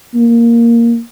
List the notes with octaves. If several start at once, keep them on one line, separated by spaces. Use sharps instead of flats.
A#3